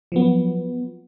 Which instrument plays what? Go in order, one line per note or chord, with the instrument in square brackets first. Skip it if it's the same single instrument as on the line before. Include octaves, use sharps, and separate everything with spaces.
[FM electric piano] F3 F#3 B3